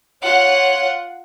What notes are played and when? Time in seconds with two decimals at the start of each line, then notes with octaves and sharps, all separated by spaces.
0.22 F4 C#5 F#5